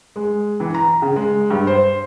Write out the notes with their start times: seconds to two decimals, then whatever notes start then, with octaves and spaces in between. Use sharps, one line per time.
0.16 G#3
0.60 E3
0.74 A#5
1.02 C#3
1.16 G#3
1.50 G2
1.67 C5